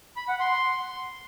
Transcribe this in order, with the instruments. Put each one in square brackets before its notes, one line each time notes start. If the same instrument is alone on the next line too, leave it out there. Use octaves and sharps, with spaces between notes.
[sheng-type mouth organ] B5
F#5
C6